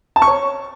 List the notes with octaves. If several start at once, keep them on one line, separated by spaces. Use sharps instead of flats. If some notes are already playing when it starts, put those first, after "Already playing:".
A5
C#6
C#5